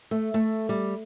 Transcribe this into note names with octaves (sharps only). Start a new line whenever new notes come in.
A3
A3
G3